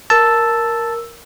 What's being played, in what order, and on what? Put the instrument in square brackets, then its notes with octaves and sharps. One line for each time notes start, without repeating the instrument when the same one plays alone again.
[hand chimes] A#4 E6 [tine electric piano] A5